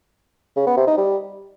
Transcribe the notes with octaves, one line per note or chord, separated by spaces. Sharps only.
C#3
B3
C3
D#4
G3